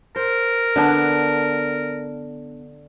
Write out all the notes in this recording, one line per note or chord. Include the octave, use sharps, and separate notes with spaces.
A#4 C5
D3 B3 D4